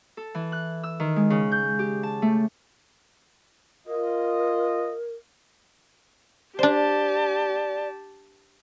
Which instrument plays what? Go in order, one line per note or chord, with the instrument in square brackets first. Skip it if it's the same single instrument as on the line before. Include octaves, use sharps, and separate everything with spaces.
[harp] A4
E3
F#6
E6
D#3
G#3
C#3
G6
G4
A5
A3
[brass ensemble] F4 D#5 [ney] A#4
[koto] D4 C5 [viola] G4 A5 [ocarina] D5